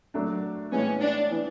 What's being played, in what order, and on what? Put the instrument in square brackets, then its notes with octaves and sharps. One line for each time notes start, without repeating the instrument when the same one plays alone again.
[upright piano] F#3 A3 D4
[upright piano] A2 E3 G#3 B3 [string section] C#4
[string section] D4
[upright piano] E3 B3